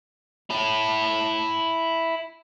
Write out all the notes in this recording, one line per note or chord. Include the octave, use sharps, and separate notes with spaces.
E4 A5